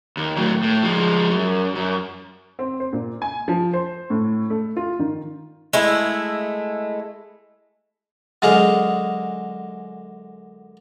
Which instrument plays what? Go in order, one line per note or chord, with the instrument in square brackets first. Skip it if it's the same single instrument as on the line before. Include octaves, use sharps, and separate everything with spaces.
[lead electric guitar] D#2
A2 F#3
A2
F3 G#3
F#2
F#2
[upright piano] C4
C5
A#2
G#5
F3
C5
A2
A3
F4
D#3
[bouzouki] G#3 A3 E4
[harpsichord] F#2 D3 G#3 G#4 A4 F5